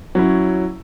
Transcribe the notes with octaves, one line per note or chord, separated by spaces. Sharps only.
F#3 C#4 E4